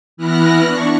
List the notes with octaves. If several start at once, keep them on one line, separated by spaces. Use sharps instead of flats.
E3 B3 E4 F6 F#6 A#6
D4 C#6